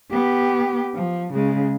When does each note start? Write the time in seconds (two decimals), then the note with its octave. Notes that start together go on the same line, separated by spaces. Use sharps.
0.11 B3 G4
0.95 F3
1.34 C#3 G#3